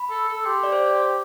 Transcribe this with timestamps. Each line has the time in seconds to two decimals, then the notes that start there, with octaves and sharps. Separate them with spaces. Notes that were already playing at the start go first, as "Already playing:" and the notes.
Already playing: B5
0.10 A4
0.29 A4
0.46 G4 C6
0.63 D5
0.72 C5